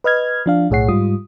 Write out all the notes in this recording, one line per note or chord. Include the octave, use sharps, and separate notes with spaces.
B4 D#5 F6 G#6
F3 D4 F5
B1 A2 G#4 C#5 F#5 C7
G#2 G3 F4 D#6